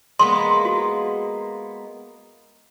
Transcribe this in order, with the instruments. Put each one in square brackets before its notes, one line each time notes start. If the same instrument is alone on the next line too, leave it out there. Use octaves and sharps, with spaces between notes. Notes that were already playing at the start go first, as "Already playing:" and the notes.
[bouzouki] G#3 A#3 B3 [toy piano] C6
[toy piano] F#4